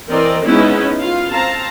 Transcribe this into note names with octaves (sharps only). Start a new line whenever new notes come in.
E3 C4 A#4 D5 D#5
G#3 B3 C#4 D#4 E4
F4 F5
C4 F5 A5 A#5